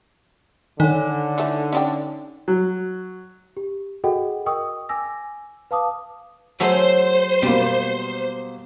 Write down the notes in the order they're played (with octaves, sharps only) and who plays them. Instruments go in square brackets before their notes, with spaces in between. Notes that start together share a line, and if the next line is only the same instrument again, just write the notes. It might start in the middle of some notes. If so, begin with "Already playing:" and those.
[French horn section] D3 [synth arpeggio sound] D#3 [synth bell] D#4 C#5
[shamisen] E3 A3
C#4 D4 G5
[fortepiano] F#3
[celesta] G4
F#4 G#4 A4 D#5 F#5 G5
A#4 D#5 G5 C#6 D#6 E6
G#5 D6 E6 A#6
B4 F5 A5 D6 D#6
[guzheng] F#3 A3 G#4 [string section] C5
[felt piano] B2 A#3 [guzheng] G3